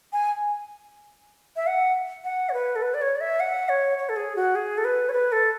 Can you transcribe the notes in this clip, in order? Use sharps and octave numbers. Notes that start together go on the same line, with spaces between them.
G#5
E5
F#5
F#5
C#5
B4
A4
B4
D5
C#5
D5
E5
F#5
C#5
C#5
A4
G#4
F#4
G#4
A4
B4
C#5
B4
A4